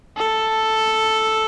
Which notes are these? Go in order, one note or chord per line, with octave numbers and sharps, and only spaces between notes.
A4